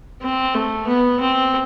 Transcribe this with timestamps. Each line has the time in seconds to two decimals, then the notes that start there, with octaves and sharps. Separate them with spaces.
0.22 C4
0.54 A3
0.87 B3
1.20 C4